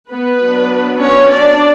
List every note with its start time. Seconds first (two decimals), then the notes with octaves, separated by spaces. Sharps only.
0.11 B3 B4
0.42 F#3 B3 D4
1.03 C#4 C#5
1.33 D4 D5